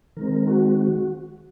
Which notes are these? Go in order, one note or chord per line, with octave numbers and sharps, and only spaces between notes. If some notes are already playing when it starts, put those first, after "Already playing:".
D#3 G#3 C4 A#4
F#4
F#4